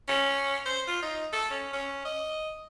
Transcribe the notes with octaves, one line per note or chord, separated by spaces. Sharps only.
C#4
C5
F4
D#4
A4
C#4
C#4
D#5